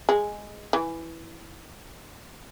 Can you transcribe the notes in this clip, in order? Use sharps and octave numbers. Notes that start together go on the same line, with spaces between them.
G#3
E3